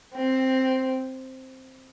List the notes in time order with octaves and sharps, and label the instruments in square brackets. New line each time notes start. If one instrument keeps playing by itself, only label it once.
[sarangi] C4